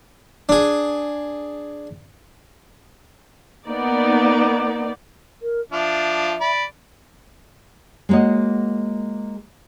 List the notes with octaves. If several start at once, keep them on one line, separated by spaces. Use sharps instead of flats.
D4 G#4
A#3 B3 D#4 D5
A#4
F3 D4 F4 E5
D5 B5
G#3 A#3 F#4 C#5 D#5